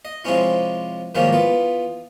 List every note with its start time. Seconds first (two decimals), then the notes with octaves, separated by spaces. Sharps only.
0.05 D#5
0.24 C3 F3 G#3 C4 C#4 E4
1.15 G#2 D#3 F3 G3 A#3 C#4
1.32 E3 B3 F4